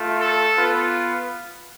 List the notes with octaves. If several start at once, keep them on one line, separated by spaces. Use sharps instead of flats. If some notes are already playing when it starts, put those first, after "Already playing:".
Already playing: A3 F4
A4
B3 F4